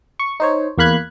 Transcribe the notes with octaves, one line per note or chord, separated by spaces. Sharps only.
C#6
D#4 C5 C#5
E2 A#3 F5 B5 F#6 G#6